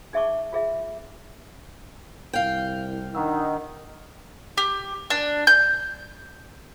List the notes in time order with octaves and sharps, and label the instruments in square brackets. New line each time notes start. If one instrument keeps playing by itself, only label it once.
[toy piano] D#4 G#4 E5 A5 C#6 D6
F4 G#4 E5
[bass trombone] C2 [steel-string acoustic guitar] F5 G5
[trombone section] D#3 D#4 [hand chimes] D4 F#5 E6
[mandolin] G4
D4
G6